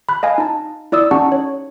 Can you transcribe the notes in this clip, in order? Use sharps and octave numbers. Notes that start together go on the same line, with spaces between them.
B5 F#6
D#5 F5 G#5
D#4 A5
E4 D5 D#6 E6
C#4 D#4 G4 F#5 A5 C#6
C#5